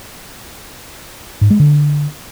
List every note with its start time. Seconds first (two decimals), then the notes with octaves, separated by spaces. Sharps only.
1.41 G#2
1.50 G#3
1.60 D3